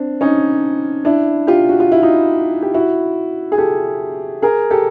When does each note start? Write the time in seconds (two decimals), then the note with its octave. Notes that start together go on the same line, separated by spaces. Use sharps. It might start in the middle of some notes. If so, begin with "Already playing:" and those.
Already playing: C4 D4
0.21 C#4 D#4
1.05 D4 E4
1.47 F4 G4
1.69 F#4
1.80 F4
1.92 E4
2.03 D#4 F4
2.62 G4
2.74 E4 F#4
3.52 G#4
3.58 G4 A4
4.42 G#4 A#4
4.71 G4 A4